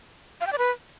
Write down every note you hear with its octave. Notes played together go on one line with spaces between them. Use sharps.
F5
G5
D5
B4